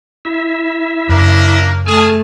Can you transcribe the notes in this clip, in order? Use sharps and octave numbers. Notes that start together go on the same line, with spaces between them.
E4 E5
F#2 C#3 A#3 D4 A#4
A3 G#4 G#5 A5 F6